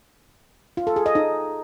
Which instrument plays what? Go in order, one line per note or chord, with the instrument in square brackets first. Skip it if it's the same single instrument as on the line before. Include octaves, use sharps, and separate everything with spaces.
[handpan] F4
A4
G#4
D#5
D#4